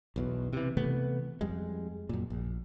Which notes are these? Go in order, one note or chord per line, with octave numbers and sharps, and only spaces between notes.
B1 E2 B2
C3 E3
C3 E3 A3 B3
F2 G3 G#3
F#2 A#2
A#1